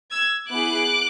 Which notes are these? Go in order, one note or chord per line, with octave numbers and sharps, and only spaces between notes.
E6 G#6
B3 E4 G#4 D6 F#6